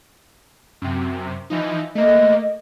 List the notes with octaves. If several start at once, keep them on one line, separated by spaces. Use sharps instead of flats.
F#2 C3
E3 F3 D#4
A3 A#3 D#5